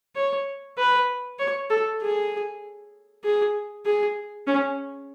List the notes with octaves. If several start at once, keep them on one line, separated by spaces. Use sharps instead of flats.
C#5
B4
C#5
A4
G#4
G#4
G#4
C#4